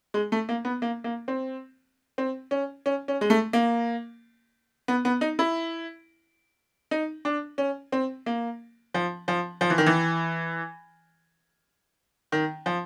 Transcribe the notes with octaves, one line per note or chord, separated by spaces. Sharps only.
G#3
A3
A#3
B3
A#3
A#3
C4
C4
C#4
C#4
C#4
G#3
A3
A#3
B3
B3
D#4
E4
D#4
D4
C#4
C4
A#3
F3
F3
F3
E3
D#3
E3
D#3
F3